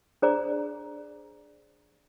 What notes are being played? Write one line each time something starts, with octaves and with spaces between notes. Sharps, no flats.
D4 G#4 C5 D5 A#5